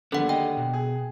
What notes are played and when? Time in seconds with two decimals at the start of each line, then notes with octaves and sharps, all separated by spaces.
0.12 D#2 D3 F3 G3 B3 A4 F#5
0.29 G#4 D#5 G5
0.57 B2
0.74 G#4